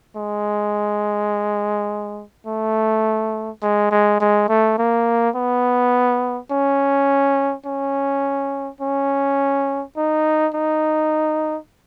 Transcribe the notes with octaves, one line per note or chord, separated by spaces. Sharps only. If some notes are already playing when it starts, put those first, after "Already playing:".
G#3
A3
G#3
G#3
G#3
A3
A#3
B3
C#4
C#4
C#4
D#4
D#4